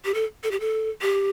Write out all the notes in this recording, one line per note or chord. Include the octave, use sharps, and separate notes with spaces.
G4
A4
A4
G4
A4
G4